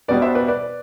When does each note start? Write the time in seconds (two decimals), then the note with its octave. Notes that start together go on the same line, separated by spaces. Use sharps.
0.08 E2 B2 G3 B4 D5
0.22 C5 E5
0.35 B4 D5
0.48 B4 D5